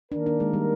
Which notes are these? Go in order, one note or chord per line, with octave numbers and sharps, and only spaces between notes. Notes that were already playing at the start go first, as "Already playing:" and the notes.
D#3 A#3 D4 D#4 A#4
D4
G#3
G3